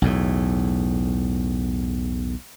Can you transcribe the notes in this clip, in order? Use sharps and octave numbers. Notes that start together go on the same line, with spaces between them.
B1 E2 A2